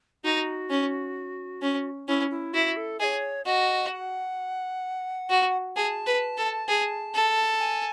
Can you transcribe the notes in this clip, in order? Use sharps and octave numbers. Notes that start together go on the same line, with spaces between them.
D#4 F#4
C#4
C#4
C#4 E4
E4
E4 F#4
A4
G#4 C#5 D#5
F#4 D#5
F#5
F#4
G#4 A5
B4
A4
G#4
A4
G#5